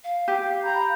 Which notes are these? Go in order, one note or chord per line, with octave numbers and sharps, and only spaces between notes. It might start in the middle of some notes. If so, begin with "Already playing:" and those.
F5
G4
A#5 B5 G6